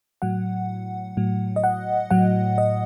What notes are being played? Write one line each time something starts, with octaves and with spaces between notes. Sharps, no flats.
A2 F#3 F#5
A2 F#3
D#5
F#5
A2 F#3 F#5
D#5